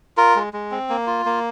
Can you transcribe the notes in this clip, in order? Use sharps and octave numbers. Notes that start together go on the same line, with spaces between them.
F4 A#4
G#3
G#3
C4
A#3
F4
A#3